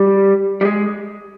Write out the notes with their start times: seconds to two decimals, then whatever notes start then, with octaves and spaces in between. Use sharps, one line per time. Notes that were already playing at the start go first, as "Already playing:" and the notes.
Already playing: G3
0.61 G3
0.65 G#3